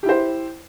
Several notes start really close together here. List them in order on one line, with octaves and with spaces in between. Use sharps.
G4 E4 C5